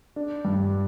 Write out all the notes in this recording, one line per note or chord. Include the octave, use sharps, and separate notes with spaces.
D4
G2